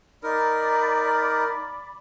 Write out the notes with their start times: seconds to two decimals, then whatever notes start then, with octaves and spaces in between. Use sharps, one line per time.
0.23 D#4 A#4 D5 B5 D6